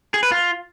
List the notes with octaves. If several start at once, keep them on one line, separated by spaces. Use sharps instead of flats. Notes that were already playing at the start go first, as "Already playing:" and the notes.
G#4
B4
F4